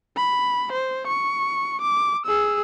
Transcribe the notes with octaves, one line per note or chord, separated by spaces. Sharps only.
B5
C5
C#6
D6
G#4 E6